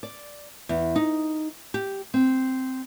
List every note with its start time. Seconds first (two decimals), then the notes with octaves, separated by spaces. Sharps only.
0.03 D5
0.69 E2
0.96 D#4
1.74 G4
2.14 C4